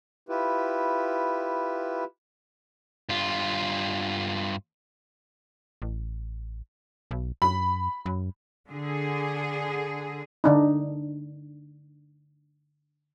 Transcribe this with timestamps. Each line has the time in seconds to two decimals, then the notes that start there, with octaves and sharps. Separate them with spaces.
0.29 E4 F4 G4 B4
3.09 G2 F4
5.82 A1
7.11 B1
7.42 F#2 B5
8.06 F#2
8.69 D3 G#4
10.44 D3 D4 D#4